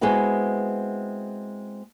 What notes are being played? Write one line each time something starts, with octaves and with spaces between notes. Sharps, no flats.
G#3 B3 C4 E4 F#4